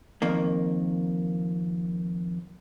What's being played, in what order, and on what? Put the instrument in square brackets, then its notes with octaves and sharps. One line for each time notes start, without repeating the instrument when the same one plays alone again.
[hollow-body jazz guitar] F2 D#3 A#3